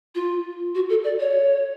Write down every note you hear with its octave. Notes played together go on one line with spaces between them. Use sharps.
F4
F#4
A4
D5
C#5